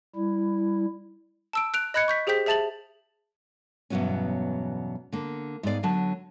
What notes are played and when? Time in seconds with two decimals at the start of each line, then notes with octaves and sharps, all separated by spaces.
0.16 G3 E4
1.53 A5 E6 D7
1.74 F#6 D7 F7
1.94 D#5 B5 F#6 G#6 C#7
2.08 C#6 G6 B6
2.27 G4 G#4 C5 G5 G6 B6
2.46 G#4 E5 A5 A6 F7 F#7
3.90 E2 G2 B2 F#3 B3 C#4
5.12 D3 A#3
5.63 G#2 G#3 B3 D5 F5
5.83 D3 F#3 A5